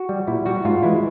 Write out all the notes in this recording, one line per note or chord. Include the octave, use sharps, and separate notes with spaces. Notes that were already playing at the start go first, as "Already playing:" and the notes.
Already playing: F#4
G3
A#2 E4
G3 F#4
G#2 F4
E3 G#3 E4